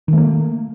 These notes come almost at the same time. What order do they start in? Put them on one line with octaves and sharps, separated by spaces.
D#3 A3 A#3